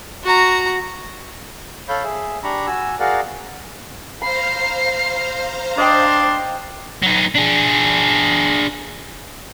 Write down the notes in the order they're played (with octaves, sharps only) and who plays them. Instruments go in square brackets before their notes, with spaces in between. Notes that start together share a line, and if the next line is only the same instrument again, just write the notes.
[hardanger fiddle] F#4 A#5
[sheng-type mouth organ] A4 C#5 F5 B5 G6
G#4 E5
D4 G4 A#5 B5 C#6
F#4 G#5 E6
F#4 G#4 A#4 D5 F5 F#5
[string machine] C5 F5 A#5 [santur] B5 [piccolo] C7
[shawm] D4 [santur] D#5 G5 [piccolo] C6
[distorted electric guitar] F#3 D#4
D4 G#4